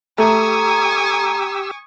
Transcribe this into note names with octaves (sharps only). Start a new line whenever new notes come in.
A3 G4 G#5 A#5 C#6 D#6 E6